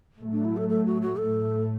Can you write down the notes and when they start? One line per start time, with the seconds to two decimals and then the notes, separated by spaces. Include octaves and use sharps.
0.19 A2 F#3 A3
0.32 D4
0.44 E4
0.57 A4
0.69 A4
0.86 F#4
1.02 F#4
1.18 A2 A3 A4